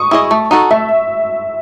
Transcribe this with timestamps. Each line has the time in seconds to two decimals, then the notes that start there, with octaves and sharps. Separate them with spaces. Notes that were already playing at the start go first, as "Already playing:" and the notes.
Already playing: C#6 D#6
0.11 E4 G#4 D#5
0.31 A3
0.51 D#4 F#4 A4
0.71 A3 E5